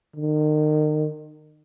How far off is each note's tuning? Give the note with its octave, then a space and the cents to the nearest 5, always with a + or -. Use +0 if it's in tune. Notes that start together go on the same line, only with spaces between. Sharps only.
D#3 -35